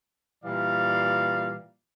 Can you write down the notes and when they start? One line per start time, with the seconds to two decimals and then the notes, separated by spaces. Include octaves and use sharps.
0.44 A#2 E3 G3 D5 F5